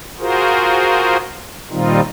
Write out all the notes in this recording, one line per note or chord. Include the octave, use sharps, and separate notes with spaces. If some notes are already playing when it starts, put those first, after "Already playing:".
F4 F#4 G#4 A#4 C5
A#2 D#3 G3 C4 D#4 F4